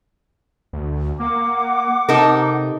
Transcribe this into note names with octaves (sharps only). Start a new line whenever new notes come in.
D2
A#3 F#5 D6
C3 D#4 A4 A#4